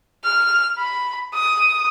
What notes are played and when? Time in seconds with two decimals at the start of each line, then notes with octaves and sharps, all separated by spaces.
0.24 F6
0.79 B5
1.34 D#6